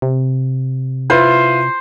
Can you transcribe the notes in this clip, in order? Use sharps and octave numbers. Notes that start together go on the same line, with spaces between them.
C3
E4 F4 B4 C5